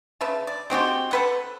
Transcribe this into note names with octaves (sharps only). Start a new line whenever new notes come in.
C#3 B4 E5 A5
D5
G#3 C4 F#4 G4
A4 B4 F#5